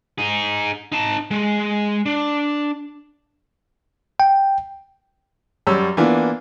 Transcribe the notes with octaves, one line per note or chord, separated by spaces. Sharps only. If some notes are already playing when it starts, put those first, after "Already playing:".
D#4 G#4
D#4 A5
G#3
D4
G5
F#2 G3 C#5 E6
E3 A#3 B3 D4 F4